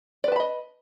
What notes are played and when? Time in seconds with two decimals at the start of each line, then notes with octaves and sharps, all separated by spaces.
0.24 D5
0.28 B4
0.32 A5
0.36 B5
0.40 D#5